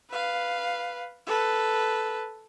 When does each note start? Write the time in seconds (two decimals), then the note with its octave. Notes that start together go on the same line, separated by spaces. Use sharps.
0.10 B4 F5
1.27 A4 B4